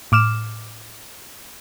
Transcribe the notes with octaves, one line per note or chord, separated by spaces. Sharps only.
A2 D6 F6 E7